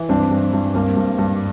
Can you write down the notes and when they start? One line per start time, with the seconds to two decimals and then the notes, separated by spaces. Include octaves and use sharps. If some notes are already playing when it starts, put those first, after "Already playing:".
Already playing: E3
0.09 G2 C4 D4
0.31 G2
0.53 G2
0.75 G2 A#3 C4
0.97 G2
1.19 G2